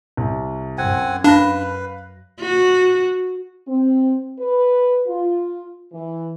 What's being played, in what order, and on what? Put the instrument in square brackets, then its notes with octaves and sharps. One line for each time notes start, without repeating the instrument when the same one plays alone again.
[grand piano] C2
[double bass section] F#2 [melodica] C4 F#5 G#5
[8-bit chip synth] D4 [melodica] B4 [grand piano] F5 B5 A#6
[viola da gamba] F#4
[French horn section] C4
B4
F4
E3